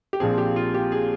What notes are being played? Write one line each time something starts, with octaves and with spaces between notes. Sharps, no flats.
G4
A#1 A#2 F3 C4 G#4
G4
F4
G4
G#4